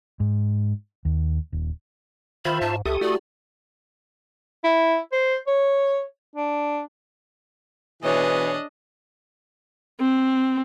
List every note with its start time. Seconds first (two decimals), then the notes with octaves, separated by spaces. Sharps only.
0.20 G#2
1.05 D#2
1.52 D#1
2.45 D#3 F4 C5 E5 B5
2.61 G#2 A5
2.86 C#2 G4 A4 E5 D#6
3.01 A3 E4 F#4 D5
4.64 E4
5.13 C5
5.47 C#5
6.36 D4
8.03 B2 E3 D4 G#4 C#5 D#5
10.00 C4